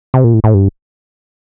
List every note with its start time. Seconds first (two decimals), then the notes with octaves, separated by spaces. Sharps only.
0.14 C3
0.24 A#2
0.34 A2
0.44 A2
0.54 G2